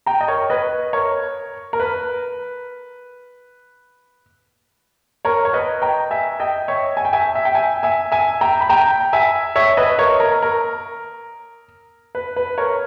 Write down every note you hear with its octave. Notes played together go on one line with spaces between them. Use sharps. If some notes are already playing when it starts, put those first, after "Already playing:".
G5 A#5
D#5
A#4 C#5
B4 D#5
A#4 C#5
A#4
B4
A#4 C#5
C#5
B4 D#5
G5 A#5
E5 G#5
D#5 G5
C#5 E5
G#5
G5
E5 G#5
E5
G5
E5 G#5
E5 G#5
E5 G#5
G5 A#5
B5
G5 A#5
E5 G#5
C#5 E5
B4 D#5
A#4 C#5
A#4
A#4
B4
B4
A#4 C#5